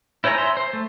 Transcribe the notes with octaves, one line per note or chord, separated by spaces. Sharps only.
E4 C5 C#5 G#5 A#5
E5 C6
C5
A3